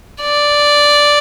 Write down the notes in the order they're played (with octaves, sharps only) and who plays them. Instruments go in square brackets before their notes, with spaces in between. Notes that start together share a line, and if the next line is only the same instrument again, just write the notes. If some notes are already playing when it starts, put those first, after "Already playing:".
[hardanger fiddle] D5